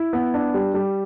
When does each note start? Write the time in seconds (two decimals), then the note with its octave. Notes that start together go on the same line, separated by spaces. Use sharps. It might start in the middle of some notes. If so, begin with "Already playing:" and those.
Already playing: E4
0.13 B3
0.34 D4
0.54 G3
0.74 G3